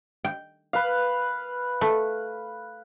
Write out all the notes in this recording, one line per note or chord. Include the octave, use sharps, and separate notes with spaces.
G5
B4 F5
A3